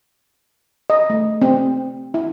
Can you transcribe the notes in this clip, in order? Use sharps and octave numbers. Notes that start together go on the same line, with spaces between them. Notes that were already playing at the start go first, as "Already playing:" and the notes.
D#5
A3
C4
E4